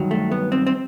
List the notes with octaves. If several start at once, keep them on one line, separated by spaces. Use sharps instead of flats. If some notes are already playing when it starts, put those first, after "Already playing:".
Already playing: G2 D#3 F#3
A3
B3
C4
C4